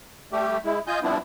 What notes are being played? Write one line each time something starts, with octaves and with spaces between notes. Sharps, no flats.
G3 A3 G4
G#3 E4
F4 D#5 G#5 G6
F3 G3 B3 C4 D4 E4